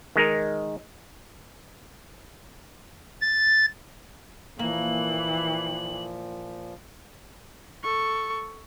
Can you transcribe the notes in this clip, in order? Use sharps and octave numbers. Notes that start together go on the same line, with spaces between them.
D#3 G#3 D#4 A#4
A6
A#2 E3 F3 A#3 F#7
A4 C#6